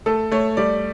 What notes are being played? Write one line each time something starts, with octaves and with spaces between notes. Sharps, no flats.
A3 A4
A3 C#5
G3 D5